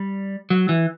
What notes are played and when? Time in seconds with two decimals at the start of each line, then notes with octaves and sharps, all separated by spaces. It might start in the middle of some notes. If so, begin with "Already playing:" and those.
Already playing: G3
0.50 F#3
0.69 E3